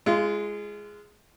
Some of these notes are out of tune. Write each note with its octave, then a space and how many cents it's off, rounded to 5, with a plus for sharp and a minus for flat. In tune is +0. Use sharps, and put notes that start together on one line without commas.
G#3 +0 F4 -30